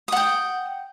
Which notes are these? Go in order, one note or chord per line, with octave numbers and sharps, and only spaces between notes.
F#5 G5 D#6